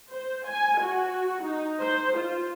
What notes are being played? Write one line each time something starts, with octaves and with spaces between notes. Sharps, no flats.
C5
G#5
F#4
D#4
C5
F4